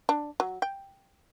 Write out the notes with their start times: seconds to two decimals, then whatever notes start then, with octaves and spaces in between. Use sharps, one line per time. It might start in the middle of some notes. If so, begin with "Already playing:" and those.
0.09 D4
0.40 F#3
0.62 G5